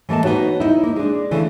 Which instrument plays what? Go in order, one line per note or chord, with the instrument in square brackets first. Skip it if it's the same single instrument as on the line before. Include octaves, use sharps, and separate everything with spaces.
[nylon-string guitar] E3 A3 A#3 D#5 A5
B3 D#4 F#4 C#5
D#4 E4
A#3
G#3 D4
C#3 E3 A3